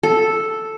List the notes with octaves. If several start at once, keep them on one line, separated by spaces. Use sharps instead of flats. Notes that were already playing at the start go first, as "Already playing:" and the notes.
A4